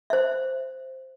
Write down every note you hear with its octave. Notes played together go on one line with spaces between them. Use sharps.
C5 E5